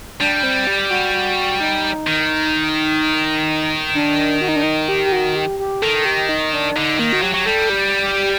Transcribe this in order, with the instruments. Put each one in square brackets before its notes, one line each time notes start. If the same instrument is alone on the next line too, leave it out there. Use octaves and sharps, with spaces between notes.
[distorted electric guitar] G3 [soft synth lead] D4
[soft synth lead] C4
G4
F#4
F#4
D#4
[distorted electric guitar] D#3
[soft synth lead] D4
F#4
D#4
D4
D#4
G4
G4
F#4
G4
G4
[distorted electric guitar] D#3 [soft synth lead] A4
[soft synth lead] G4
D#4
D4
[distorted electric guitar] D3 [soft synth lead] D#4
[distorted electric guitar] D#3 [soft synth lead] A#3
[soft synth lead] F#4
[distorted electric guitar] F#3 [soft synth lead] G4
[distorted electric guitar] F#3
[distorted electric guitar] G3 [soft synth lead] A4
[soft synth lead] G4
G4